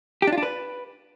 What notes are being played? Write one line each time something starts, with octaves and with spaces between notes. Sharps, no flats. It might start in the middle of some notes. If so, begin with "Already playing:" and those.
G4
D4
F4
D4
B4